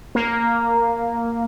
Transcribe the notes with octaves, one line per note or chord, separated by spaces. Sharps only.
A#3